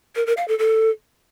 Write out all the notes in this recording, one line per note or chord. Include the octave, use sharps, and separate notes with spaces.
A#4
A#4
F5
A4
A4